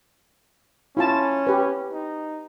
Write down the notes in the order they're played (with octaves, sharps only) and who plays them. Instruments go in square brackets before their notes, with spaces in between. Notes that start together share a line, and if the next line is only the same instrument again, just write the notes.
[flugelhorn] C#4 [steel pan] E4 F4 A5
[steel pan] G4 B4
[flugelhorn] D#4